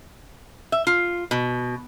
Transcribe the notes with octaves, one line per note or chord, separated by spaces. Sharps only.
E5
F4
B2